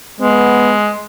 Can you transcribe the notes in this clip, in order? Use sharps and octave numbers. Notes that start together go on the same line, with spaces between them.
G#3 B3